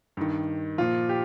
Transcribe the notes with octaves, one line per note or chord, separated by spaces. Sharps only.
G2 D#3
A#2 F3 F4
G4